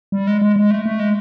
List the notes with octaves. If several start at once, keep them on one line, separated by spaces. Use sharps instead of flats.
G3
G#3
G#3
G#3
A3
A3
G#3